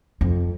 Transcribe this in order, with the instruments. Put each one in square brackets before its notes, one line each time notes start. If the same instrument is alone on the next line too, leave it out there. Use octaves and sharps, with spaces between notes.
[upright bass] F2